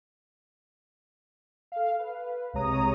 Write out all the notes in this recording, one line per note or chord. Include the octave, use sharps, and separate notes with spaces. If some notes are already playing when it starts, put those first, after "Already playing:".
A4 F5
B4
C2 C3 G#3 C#5 A#5 D#6